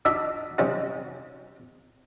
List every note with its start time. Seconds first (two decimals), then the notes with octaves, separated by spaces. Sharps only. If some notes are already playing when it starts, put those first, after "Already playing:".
0.05 D4 D#4 F#4 D5 E5
0.58 C3 G3 C#4 D#4 F#4